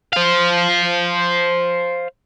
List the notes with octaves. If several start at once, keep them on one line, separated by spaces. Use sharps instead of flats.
C5 F5